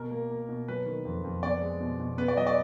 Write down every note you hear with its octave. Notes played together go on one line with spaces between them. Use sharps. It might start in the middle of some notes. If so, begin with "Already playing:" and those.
Already playing: B2 A#4
A#3
A#3
B2
F#3 B4
D#3
F2
F2
B3 D5
G#3
B2
B2
B3 B4
D5
F#3 D#5
D5